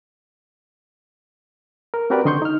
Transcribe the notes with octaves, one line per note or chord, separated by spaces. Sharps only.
A#4
C4 F#4 G4 A#4 B4 D5
D3 D#5 C6 C#6 G6
D#4 F6